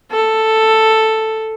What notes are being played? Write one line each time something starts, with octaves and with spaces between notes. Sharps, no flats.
A4